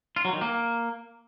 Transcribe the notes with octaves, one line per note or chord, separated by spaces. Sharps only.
F4
F#3
D#3
A#3